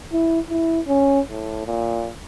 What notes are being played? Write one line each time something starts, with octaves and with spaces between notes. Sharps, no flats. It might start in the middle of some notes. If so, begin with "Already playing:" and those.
E4
E4
C#4
A2
A#2